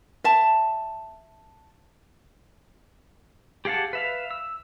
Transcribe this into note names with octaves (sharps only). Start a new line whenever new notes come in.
E5 A5
G4 G#4 F5 F#5 A5
B4 E5 F5
E6